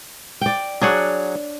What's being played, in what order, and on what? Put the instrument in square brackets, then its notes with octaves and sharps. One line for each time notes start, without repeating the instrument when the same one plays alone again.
[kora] D5 G5
[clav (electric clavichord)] F#3 G#4 F#5 [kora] D4 C#5